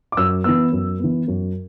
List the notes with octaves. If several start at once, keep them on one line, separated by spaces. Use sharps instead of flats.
D6
F#2 E6
E3 B3 E6
F#2
E3 B3
F#2